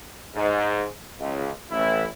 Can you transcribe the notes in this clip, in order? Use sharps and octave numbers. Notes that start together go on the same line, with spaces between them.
G#2
C#2
A1 E4